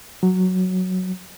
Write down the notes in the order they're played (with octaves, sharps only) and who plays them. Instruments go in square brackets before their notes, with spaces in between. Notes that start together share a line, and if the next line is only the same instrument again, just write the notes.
[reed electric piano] F#3